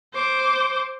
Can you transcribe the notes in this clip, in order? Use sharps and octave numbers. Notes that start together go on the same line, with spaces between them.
C5 D6